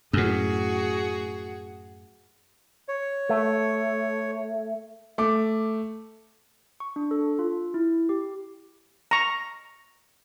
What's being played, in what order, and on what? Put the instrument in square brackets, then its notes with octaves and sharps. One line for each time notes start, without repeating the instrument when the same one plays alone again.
[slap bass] F#2 A2 [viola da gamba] F#4 G#4
[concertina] C#5
[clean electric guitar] A3
[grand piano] A3 D6
[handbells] C#6
D4
A4
F4
E4
G4
[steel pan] A#5 C#6